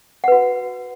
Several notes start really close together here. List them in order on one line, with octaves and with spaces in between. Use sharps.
F#5 B4 F#4